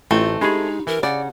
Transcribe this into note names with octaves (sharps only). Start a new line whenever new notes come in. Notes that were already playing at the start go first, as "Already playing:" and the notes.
A1 A3 C4 E4 F4
G#3 D4 D#4 G4 G#4 B5
E3 A#4
C#3 D5 F#5